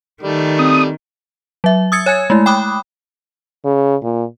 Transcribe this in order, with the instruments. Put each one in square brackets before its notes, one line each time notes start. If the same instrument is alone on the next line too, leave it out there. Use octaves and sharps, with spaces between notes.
[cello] D#3 [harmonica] G3 A3
[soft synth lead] C4 [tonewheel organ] D#6
[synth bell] F#3 E5
D#6 E6 G#6 A6 C#7
C#5 G#5 G#6
G#3 A3 E4
G5 B5 D6 D#6 F#6
[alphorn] C#3
A#2